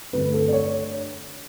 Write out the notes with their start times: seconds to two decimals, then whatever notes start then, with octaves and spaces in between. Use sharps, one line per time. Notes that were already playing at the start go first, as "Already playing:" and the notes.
0.13 G2 D3 A3 B4
0.34 A4
0.48 D5
0.53 C#5